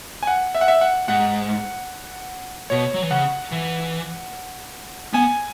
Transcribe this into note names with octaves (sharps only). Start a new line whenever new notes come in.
G#5
F#5
E5
F#5
E5
F#5
G#2 F#5
B2 C#5
F#3
E3
C#3 F#5
E3
B3 G#5